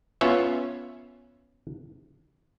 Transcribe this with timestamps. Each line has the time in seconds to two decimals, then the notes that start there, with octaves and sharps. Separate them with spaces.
0.21 B3 C#4 F4 C#5 E5